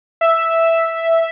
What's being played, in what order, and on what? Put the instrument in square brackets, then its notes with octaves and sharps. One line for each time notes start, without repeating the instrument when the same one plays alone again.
[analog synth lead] E5